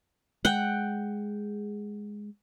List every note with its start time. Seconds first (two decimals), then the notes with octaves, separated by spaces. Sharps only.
0.45 G#3 F#5 G5